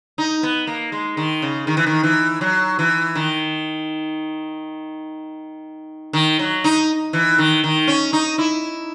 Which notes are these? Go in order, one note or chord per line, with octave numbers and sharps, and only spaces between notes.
D#4
B3
A#3
G#3
D#3
C#3
D#3
E3
D#3
E3
F#3
E3
D#3
D#3
F#3
D#4
E3
D#3
D#3
C#4
D#4
E4